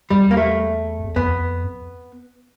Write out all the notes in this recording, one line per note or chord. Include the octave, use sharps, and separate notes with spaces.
E2 G3
A#3
A3
E2
F2 B3